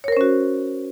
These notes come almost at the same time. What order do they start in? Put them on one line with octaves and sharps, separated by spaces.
C#5 A#4 C5 C#4 F#4